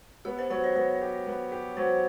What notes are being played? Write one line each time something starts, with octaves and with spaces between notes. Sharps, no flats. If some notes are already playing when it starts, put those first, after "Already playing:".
B3 G4
C5
F#3 C5
C#5
B3 C#5
G4
B3
G4
F#3 C5